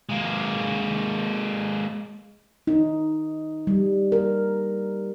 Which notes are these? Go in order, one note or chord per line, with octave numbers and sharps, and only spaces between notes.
G#3 A#3
D#4
G3
A#4